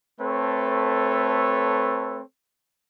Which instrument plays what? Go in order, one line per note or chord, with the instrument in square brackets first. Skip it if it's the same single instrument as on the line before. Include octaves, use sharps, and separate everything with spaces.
[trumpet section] A3 C4 A4 B4 C#5